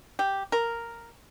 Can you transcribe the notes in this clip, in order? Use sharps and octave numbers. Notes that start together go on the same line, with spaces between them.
G4
A#4